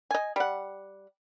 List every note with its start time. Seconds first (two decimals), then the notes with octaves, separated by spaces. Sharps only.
0.11 D#5 G#5
0.36 G3 F#5